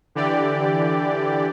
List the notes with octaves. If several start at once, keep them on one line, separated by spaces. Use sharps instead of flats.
D3 E3 G4 D5